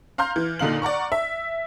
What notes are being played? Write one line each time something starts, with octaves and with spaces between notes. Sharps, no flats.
F5 A#5 C6 F6 G6
E3
A#2 D3 D#4 F5 F#7
D5 F#5 A#5 C#6
E5